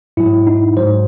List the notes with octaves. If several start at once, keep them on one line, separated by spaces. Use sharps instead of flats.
G#2 F#3 E4
D#4
G#2 F#3 C5